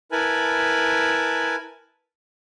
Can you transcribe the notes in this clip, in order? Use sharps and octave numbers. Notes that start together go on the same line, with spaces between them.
E4 A#4 B4 G#5 A5 B5